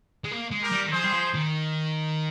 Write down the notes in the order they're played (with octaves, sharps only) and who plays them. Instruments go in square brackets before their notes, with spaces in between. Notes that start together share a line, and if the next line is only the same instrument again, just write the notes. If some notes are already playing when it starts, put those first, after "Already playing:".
[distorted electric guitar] G#3
A#3
G#3
[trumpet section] G4 A#4
[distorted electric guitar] G3
D#3
[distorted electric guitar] F3 [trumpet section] G#4 C5
[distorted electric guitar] G3
F3
D#3